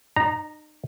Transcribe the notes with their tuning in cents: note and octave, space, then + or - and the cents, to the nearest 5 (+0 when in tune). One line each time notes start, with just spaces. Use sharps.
D#4 -35 A#5 +0